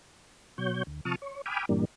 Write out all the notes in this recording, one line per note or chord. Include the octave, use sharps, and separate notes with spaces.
B2 F#3 C#5 G6
D2
C3 F3 A5 C#6 D#6 F6
C#5
G5 G#5 B5 D6 D#6 F6
G2 A#2 E3 G3 A#3 D4